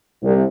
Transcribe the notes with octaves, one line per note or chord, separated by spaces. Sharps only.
C2